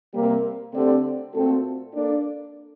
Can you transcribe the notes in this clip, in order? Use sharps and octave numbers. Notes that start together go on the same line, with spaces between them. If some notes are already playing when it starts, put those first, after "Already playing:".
C3 G3 A#3
D3 A3 C4 G4 D5
A#2 A3 C4 F#4 A4
A#3 D4 A4 D5